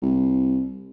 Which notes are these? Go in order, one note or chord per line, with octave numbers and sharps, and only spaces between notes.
C2